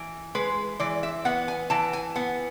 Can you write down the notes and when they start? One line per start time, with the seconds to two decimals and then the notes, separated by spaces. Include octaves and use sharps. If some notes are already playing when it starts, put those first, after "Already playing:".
Already playing: E3
0.35 G#3 B4
0.80 E3 D5
1.03 E5
1.25 B3 F#5
1.48 G#5
1.70 E3 A5
1.93 G#5
2.16 B3 F#5